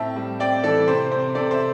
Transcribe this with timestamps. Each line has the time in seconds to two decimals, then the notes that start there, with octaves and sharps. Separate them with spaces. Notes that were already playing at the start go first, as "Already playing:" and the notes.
Already playing: A2 C4 E5 A5
0.16 G3
0.40 C4 D5 G5
0.63 E3 A4 D5
0.88 C3 C5
1.11 C4 C5
1.35 C3 A4 D5
1.51 C5 E5